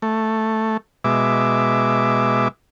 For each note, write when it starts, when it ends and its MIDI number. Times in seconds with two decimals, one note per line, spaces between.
0.02 0.77 57
1.04 2.48 47
1.04 2.48 56
1.04 2.48 76
1.04 2.48 86